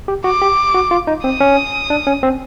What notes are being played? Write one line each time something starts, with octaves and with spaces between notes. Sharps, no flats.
G4
F#4 D6
G4
F#4
F4
D#4
C4 D#6
C#4
D4
C#4
C4